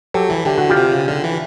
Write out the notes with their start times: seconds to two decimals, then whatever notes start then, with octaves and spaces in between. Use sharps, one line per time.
0.14 F#3 G4 A4
0.30 E3
0.45 D3 G4
0.58 F#4
0.70 F4 G4
0.77 C3
0.92 C#3
1.08 D3
1.24 E3